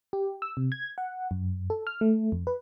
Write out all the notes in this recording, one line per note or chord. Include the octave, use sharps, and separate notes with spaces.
G4
E6
C3
G#6
F#5
F#2
A4
F6
A3
F2
B4